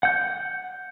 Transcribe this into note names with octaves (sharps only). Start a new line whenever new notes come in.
F#5 G6